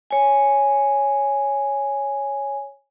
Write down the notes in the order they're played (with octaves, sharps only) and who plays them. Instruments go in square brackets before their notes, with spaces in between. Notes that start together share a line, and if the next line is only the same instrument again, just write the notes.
[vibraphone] C#5 G#5